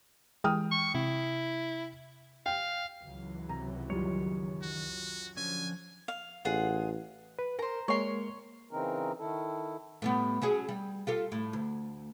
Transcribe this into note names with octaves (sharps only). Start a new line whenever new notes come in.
E3 G#3 G5 D#6 F6
C#6
C3 E4
F5 G5
C#2 E3 F#3
C3 A#5
F#2 D#3 G3 F4 C#5
F#4
D3 F3 C#4 G#5
F5
A1 F4 G#4 F#5
B4
A#4 C5 A#5
G#3 A#3 A#4 C#5 C6
C#3 E3 C4 D#4 A#4
D#3 E4 A4
A2 G3 B3
F#3 C#4 G#4
G3
F4 G4 A4
A2
D2